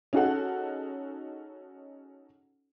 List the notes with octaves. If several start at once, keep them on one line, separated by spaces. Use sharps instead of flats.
C#4 D#4 F#4 G#4 A4 F#5